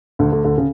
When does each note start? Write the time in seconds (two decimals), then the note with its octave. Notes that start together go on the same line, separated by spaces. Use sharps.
0.19 D2 D3
0.32 D2 D3
0.45 D2 D3
0.58 C#3